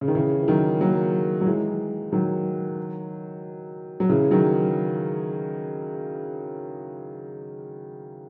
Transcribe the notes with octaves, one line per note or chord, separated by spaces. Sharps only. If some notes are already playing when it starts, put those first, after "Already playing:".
C#3
D#3
C#3 E3
E3
D#3 F#3
F#3 A#3
F#3
E3 G#3
D#3 F#3
F#3
C#3 E3
D#3 F#3